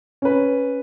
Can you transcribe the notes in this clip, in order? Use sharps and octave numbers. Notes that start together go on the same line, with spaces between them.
C#4 B4